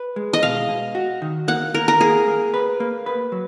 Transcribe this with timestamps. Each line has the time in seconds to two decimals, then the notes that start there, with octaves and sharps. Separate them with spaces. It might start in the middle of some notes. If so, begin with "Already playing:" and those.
Already playing: B4
0.16 G#3
0.33 D#5
0.42 B2 F5
0.69 B2
0.95 F#4
1.22 D#3
1.48 A#3 F#5
1.74 A#3 A#4
1.88 A#4
2.01 A#3 G#4
2.27 A#3
2.54 B4
2.80 A#3
3.06 B4
3.32 F#3